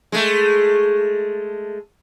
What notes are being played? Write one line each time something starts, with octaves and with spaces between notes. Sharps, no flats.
G#3 A3